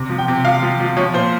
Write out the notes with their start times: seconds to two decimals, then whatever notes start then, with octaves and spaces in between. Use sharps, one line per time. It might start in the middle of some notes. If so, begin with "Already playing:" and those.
Already playing: C3
0.10 F3
0.18 G5
0.28 C3
0.45 F3 F5
0.63 F3
0.80 F3
0.97 F3 C#5
1.14 A#2 C5